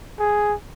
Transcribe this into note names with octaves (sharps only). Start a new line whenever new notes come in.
G#4